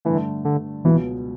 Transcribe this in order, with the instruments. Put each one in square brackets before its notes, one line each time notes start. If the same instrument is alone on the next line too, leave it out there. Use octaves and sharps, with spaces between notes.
[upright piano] G2 D3 A3 [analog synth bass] E3
[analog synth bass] D3
[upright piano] C#2 B2 F#3 B3 [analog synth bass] E3